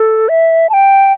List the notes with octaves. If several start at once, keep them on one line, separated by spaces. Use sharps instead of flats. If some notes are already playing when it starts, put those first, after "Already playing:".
Already playing: A4
E5
A5
G5